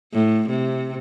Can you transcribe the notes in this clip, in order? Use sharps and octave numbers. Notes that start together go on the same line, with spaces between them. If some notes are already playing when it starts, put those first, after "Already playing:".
A2
C3